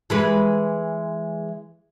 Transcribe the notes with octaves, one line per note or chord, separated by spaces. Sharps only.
E3 G#3 B4